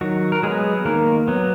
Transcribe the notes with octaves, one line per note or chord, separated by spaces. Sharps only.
D#3 F#3 F#4
A#4
F#3 G#3 B3 G#4
D#3 A#3 A#4
F#3 B3